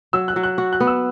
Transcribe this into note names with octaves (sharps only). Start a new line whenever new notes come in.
F#3 E6
F#6
F#3
F#6
F#4
F#6
B3
E6